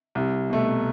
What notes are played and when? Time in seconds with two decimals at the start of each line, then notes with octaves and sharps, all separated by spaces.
0.15 C2
0.50 B2 A3